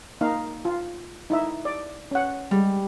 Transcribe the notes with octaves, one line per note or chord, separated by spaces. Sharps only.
A#3 D#4 F5
F4
D#4 E4 E5
D5
C#4 F#5
G3 G#3